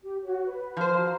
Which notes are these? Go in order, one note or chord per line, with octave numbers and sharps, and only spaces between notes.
G4
F#4 C#5
B4
F3 C5
F#4 F5 A#5